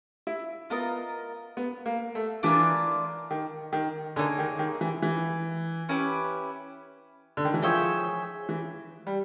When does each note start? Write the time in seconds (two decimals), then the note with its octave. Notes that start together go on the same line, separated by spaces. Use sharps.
0.27 E4
0.70 B3 F4 A#4 D#5
1.57 B3
1.86 A#3
2.15 A3
2.43 E3 D4 F4 A#4
3.31 D#3
3.73 D#3
4.16 D3 A#3 D#4 G#4 C#5
4.39 D#3
4.59 D#3
4.81 E3
5.02 E3
5.89 C#4 E4 G4 B4
7.37 D3
7.45 D#3
7.54 E3
7.63 F3 G#4 C#5 E5 G5
8.49 E3
9.07 G3